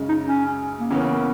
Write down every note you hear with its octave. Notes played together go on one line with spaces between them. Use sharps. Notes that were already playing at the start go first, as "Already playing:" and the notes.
Already playing: F#2 C#3 G#3
D#4
C#4
A#3
C#3 E3 A#3 B3 C#4